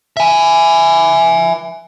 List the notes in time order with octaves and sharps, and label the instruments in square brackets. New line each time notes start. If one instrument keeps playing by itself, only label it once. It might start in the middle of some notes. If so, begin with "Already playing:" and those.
[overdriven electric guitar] E5 G#5